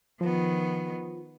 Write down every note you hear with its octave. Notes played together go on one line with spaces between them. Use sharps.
D#3 F3 B3